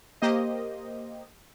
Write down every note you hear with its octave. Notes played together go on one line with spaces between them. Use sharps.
A#3 G4 C5 D#5